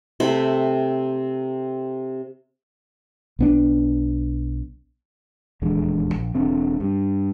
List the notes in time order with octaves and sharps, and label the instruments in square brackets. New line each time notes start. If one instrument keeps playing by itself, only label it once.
[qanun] C3 A3 C5 B5
[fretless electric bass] B1 B3 D4
[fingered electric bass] D#1 E2 D3 G#3
A#1
E1 D3 C4
G2